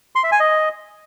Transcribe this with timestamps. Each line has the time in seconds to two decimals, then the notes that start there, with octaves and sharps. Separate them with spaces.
0.15 C6
0.24 E5
0.32 G#5
0.40 D#5